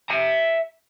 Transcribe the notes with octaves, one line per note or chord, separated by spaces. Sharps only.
E5 A#5